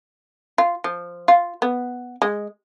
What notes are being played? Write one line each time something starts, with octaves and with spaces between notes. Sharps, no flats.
F4
F3
F4
B3
G#3